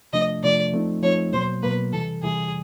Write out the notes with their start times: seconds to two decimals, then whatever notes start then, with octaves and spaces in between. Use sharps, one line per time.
0.13 C3 F3 A3 D4 D#5
0.43 C3 F3 A3 D4 D5
0.73 F3 A3 C4 D#4
1.03 F3 A3 C4 D#4 C#5
1.33 B2 F#3 A#3 C5
1.63 B2 F#3 A#3 B4
1.93 C3 E3 G3 A4
2.22 C3 E3 G3 G#4